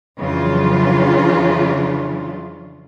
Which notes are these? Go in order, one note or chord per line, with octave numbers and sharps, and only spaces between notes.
F2 C#3 E3 F#3 D4 F4